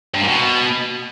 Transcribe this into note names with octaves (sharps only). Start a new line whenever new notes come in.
G2
A#2
B2